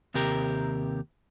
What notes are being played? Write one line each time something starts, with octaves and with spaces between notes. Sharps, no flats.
D#2 C3 G4 A#4 A#5